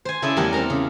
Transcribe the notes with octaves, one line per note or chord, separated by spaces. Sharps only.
C5 G#5
C#3 E4 A4 D5 E5 G#5
E2 G3 A3 G4 A#4 F#5
C4 A4 A#4 A#5
C#3